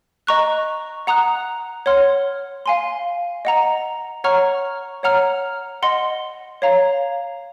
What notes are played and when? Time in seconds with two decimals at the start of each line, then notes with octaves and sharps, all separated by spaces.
0.27 D#5 A#5 C#6 F#6
1.07 F#5 A#5 D#6 F#6
1.86 C#5 F#5 C6 F6
2.66 F5 G#5 C6
3.45 D#5 F#5 A#5
4.24 C#5 F#5 A#5 C#6 F6
5.03 C#5 F#5 A#5 F6
5.83 D#5 F#5 C6
6.62 C#5 F5 A#5